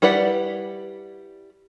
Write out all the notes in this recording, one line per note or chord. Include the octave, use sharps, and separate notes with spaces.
G3 E4 B4 D5 F#5